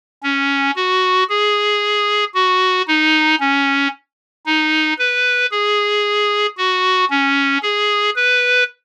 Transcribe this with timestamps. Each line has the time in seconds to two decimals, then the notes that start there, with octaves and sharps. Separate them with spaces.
0.23 C#4
0.76 F#4
1.29 G#4
2.35 F#4
2.88 D#4
3.40 C#4
4.46 D#4
4.99 B4
5.51 G#4
6.57 F#4
7.10 C#4
7.63 G#4
8.16 B4